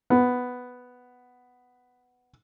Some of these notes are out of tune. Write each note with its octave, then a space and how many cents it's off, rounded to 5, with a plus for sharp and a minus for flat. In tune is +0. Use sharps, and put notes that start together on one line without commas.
B3 +5